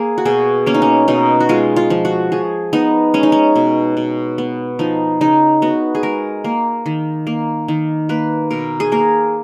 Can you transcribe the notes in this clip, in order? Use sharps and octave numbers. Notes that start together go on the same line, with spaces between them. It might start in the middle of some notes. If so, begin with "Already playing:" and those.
Already playing: A#3 G#4
F#4
B2 G#4
A#3 C#4
D#4
C#4
B2 D#4
F#4
G#3 F4
F4
F3
F#4
F3 G#4
B3 D#4
G#3 C#4
D#4
C#4
B2
B2
B3
F3 D#4
C#3 D#4
B3 F#4
G#4
G#3 A#4
A#3
D#3
A#3
D#3
A#3 B4
B2 A#4
G#4
A#3 A#4